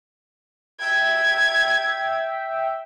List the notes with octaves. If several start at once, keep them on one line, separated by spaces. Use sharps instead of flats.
E5 G5 G#6